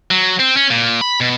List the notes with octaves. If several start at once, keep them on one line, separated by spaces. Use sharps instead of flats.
F#3
C4
C#4
A#2
B5
B2